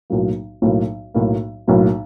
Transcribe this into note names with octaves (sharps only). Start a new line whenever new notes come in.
B1 A2 F#3 A#3
B1 A2 F#3 A#3
B1 A2 F#3 A#3
B1 A2 F#3 A#3